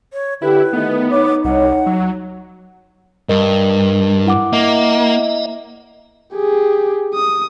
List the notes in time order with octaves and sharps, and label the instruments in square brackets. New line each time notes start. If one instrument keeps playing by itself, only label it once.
[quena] C#5
[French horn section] D3 G4 [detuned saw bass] E4 [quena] B4
[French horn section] D#3 A3 D#4 [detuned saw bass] B3
[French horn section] D#4 C#5 [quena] D6
[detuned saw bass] C2 [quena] F#5
[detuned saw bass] F#3
[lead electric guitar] G2 [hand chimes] A#4 D#5
[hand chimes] E4 F#5 D6
[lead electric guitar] A#3 [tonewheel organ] D#5 E5
[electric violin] G4 G#4
D#6